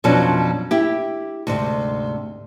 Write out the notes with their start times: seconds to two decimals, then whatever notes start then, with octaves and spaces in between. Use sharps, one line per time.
0.04 F2 B2 F3 F#3 C#4 D4
0.71 E4 G4
1.47 D2 G#2 C3